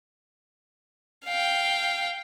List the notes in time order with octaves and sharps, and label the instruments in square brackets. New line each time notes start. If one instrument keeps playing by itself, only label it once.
[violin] F5 G5